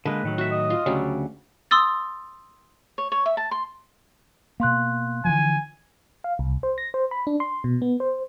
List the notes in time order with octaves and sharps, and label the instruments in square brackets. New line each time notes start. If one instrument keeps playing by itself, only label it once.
[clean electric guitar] D3 G#3 A#3 [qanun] B4
[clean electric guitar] A2 D#3 F#3
[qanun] F#4 E5
[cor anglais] D#5
[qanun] F4
[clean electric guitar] D2 C#3 [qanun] F#3 G3 D5
[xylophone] C6 D#6 E6 A6
[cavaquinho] C#5
C#5
E5
A5
C6
[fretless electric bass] B2 A#3 [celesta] F5 C6 F#6
[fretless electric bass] D3 E3 F3 [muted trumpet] G#5
[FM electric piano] F5
C2
C5
A#6
C5
B5
D4
C6
B2
B3
C5